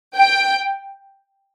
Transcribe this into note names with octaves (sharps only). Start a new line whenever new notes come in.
G5